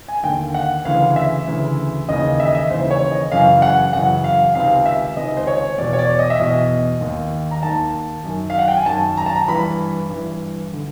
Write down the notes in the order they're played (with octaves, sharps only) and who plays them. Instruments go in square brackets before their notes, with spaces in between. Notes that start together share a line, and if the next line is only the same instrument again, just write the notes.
[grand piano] G#5
D#2 D3 G5
F#5
D2 C#3 E3 F5
E5
D2 C#3 E3
D#2 C#3 E3 D#5
E5
D#5
E5
D#2 C#3 E3 C5
C#5
D#5
F#2 C#3 E3 F5
F#5
F#2 C#3 E3 F#5
F5
C#2 C3 D#3 F5
E5
C#2 C3 D#3 D#5
C5
C#5
E2 B2 D5
C#5
D5
D#5
E5
E2 B2 D#5
D#2 D#3
A#5
D#2 D#3 A5
F#2 D#3
F5
F#5
G5
G#5
F#2 D#3 A5
A#5
A5
A#5
G2 E3 B5
G2 E3
D3